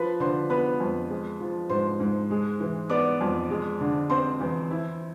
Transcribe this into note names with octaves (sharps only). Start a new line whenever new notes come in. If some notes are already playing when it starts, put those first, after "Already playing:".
Already playing: F3 B4 B5
D3 C5 C6
B3 B4 B5
F2
G#3
F3
G#2 C5 C6
G#2
G#3
E3
B3 D5 D6
F2
G#3
D3
C4 C5 C6
E2
E4